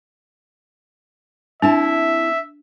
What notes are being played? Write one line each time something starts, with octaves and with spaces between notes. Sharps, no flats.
C4 D4 E4 E5 A5